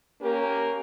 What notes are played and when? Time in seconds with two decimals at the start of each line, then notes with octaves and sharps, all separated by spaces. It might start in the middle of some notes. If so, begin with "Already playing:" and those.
0.21 A#3 C#4 G4 A#4